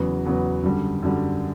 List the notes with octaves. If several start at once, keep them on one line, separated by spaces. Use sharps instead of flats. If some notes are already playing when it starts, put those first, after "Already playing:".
Already playing: E2 C#3 F#3 B3
E2 C#3 F#3 B3
F#2 D3 G3
F#2 D3 G3